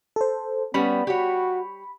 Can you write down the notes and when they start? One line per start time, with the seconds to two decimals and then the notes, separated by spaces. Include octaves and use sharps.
0.16 A4 C5
0.74 G3 B3 C#4 B5
1.07 F#4 G4 C#5